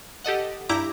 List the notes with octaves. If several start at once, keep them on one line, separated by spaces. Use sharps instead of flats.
G4 A4 D#5 F#5
G2 E4 G4 A#5 D6